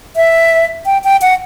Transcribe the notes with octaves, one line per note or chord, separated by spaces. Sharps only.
E5
G5
G5
F#5